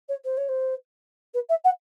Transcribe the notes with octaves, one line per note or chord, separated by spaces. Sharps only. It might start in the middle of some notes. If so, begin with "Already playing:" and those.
C#5
C5
C#5
C5
B4
E5
F#5